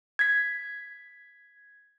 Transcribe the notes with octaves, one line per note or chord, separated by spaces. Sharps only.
G#6 B6